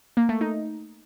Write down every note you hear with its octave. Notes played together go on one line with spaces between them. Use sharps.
A#3
A3
D#4